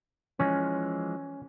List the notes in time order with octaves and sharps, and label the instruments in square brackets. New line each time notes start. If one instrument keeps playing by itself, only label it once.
[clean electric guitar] E3 F3 G#3 [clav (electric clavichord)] C#4